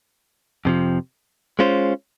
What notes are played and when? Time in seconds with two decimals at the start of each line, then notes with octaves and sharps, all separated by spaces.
0.65 F2 C3 F3
1.59 G#3 C#4 F4 C5